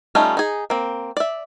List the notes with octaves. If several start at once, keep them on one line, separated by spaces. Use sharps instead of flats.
G3 A3 C#4 D#4 F4
D#4 G#4
A#3 C4
D5 E5